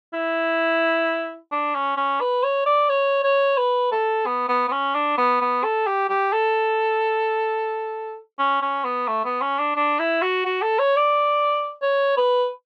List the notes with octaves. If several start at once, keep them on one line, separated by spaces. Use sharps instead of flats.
E4
D4
C#4
C#4
B4
C#5
D5
C#5
C#5
B4
A4
B3
B3
B3
C#4
D4
B3
B3
A4
G4
G4
A4
C#4
C#4
B3
A3
B3
C#4
D4
D4
E4
F#4
F#4
A4
C#5
D5
C#5
B4